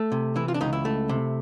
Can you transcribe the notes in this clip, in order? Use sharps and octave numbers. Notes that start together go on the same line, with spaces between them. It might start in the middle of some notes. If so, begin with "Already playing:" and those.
Already playing: A3
C3
E3 E4
F4
D4
C#2 D#4
E4
A3
C3